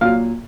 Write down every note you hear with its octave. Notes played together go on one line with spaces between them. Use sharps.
A#2 F#3 F5